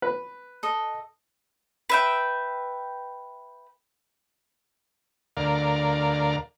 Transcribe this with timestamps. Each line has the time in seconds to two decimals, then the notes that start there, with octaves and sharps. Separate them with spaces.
0.02 B4
0.63 A4 D#5
1.89 B4 E5 G5
5.37 D2 A#4 D5 F5